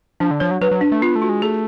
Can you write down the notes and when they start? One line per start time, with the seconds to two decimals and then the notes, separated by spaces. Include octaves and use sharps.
0.20 F3 D4
0.31 D3
0.40 F3 C#5
0.51 F#3
0.61 F#3 B4
0.71 F#3
0.81 D4
0.92 A3
1.02 B3 F4
1.16 A3
1.22 F#4
1.29 G#3
1.42 A3 G#4